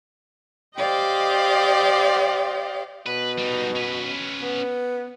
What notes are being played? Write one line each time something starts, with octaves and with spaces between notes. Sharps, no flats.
G4 C5 D5 D#5 F5 G5
B2 B4
G3 D#4
C#4 B4
B3